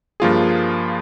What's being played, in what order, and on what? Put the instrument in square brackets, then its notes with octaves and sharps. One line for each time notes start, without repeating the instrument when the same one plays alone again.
[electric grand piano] G2 F3 A#3 F4 G#4